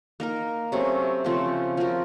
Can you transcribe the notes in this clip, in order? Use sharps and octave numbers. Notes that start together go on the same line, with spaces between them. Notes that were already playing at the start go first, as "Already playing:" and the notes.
A#3 D#4 A#4
C3 F#3 A3 C#4
C#3 F3 A3 C4
F3 C4 F#4 A#4